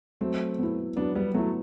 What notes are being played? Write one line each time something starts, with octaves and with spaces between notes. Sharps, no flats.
F#3 A3 C4
B3 E4
F#3 B3 D4
G3 B3
F#3 A3 B3 E4